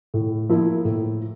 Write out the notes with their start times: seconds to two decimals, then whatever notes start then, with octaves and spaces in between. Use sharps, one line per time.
0.14 A2
0.49 F3 A#3 E4
0.85 A2